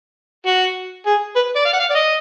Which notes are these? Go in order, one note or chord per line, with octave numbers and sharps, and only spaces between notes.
F#4
G#4
B4
D5
F5
F#5
F5
D5
D#5